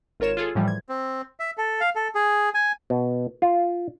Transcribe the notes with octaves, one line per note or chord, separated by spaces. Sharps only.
G#1 F4 A#4 C#5 E7
F4 G#4 A4
A2 E3 F3 G3
G#6
C4
E5
A4
F5
A4
G#4
G#5
B2
F4